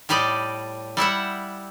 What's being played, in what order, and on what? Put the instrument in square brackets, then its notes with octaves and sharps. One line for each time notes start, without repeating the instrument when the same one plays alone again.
[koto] A2 G3 G4 D5 D#5
G3 E4 E5 F#5